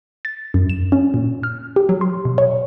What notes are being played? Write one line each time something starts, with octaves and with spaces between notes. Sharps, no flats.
A6
F#2
E7
C#4
A#2
F6
G4
F#3
C6
B2
C#5